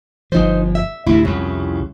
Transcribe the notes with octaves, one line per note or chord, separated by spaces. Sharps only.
G1 F3 D#4 C5
E5
D2 G#2 C3 E4
C2 F2 C#3